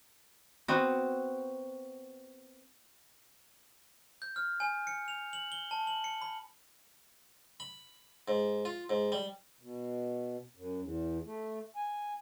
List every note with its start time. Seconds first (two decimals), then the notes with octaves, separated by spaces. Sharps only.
0.68 B3 C4 F#4
4.22 G6
4.36 F6
4.60 G#5
4.87 C#7
5.08 F7
5.33 F#7
5.52 G7
5.71 A5
5.87 F#7
6.04 C#7
6.22 B5
7.60 B5
8.28 G#2
8.65 F4
8.90 G#2
9.12 G3
9.61 B2
10.56 F#2
10.81 E2
11.25 A3
11.76 G#5